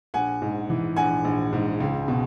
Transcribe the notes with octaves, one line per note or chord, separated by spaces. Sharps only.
A#1 F#5 G#5
G#2
E3
A#1 F#5 G#5
A#1
G#2
C#2
B2